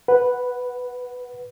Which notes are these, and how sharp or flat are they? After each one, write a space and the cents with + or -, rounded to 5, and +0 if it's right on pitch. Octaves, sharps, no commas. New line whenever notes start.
B4 +0 F#5 +0